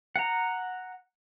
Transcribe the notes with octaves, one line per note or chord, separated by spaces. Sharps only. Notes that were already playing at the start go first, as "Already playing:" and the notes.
F#5 A#5